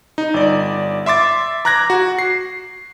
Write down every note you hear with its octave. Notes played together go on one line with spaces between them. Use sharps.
D#4
G1 D5
E5 C6 D6 A6
A#5 D6 F#6 G#6 A#6
F#4
C7